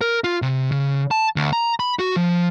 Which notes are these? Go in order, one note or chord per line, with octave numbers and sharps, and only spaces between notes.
A#4
F4
C3
C#3
A5
D2
A#5
B5
F#4
F3